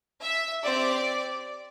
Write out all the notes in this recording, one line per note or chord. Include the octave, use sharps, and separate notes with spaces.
E5
C4 G4 D5